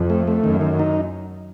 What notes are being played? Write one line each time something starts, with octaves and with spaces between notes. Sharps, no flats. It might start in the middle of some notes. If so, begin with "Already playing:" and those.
Already playing: F2
A3
A3
F#2 D#3
D#3
D#4